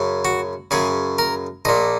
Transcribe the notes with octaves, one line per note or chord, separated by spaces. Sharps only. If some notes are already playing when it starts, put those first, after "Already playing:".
Already playing: F#2 C#3
F#4
F#2 C#3 G#4
A#4
A#1 A#2 D#5